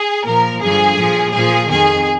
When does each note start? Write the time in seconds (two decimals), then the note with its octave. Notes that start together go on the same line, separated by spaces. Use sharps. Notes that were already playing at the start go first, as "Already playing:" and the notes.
Already playing: G#4
0.25 A#2 F3 A#4
0.61 G2 D3 F3 G#4
0.97 A#2 F3
1.34 A#2 F3 G#4
1.69 F2 D#3 G#4